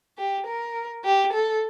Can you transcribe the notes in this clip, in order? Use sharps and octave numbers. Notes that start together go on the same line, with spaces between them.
G4
A#4
G4
A4